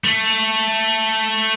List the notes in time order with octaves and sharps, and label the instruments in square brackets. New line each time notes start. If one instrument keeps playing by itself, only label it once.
[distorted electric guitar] A3